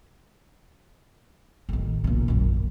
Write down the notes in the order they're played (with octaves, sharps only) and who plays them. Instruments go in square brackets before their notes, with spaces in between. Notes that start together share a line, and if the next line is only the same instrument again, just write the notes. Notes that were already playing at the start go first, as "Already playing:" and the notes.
[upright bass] A1 D#3
A#1 C#3
A#1 F#2